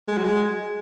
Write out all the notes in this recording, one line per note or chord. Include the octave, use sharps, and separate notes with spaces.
G#3
F#3
G#3